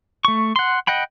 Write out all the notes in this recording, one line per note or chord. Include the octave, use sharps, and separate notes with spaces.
A3 C#6
F#5 C6
D#5 F#5 G5 B5